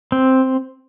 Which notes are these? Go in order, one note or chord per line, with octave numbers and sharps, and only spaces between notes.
C4